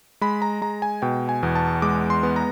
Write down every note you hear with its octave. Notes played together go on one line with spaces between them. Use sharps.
G#3 B5
A#5
G#3 A#5
G#5
B2 G5
G#5
E2
A5
G#3 D6
C6
B3
A#5